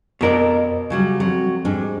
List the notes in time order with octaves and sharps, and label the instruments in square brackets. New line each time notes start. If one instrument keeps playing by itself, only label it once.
[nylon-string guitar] F2 F4 D5 [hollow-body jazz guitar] B2 A#4
[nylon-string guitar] C#3 F#3 G3
[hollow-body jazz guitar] F2 [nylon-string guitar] F#3
[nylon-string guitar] G#2 G3 D4